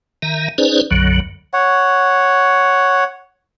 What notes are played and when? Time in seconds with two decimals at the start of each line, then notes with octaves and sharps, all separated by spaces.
0.22 D#3 E5 A#5
0.58 C#4 D#4 G#4 B4 C5 D5
0.91 B1 F#2 D3 F#3
1.54 C#5 F#5